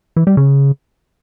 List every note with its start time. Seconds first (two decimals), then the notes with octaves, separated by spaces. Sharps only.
0.16 E3
0.27 G3
0.37 C#3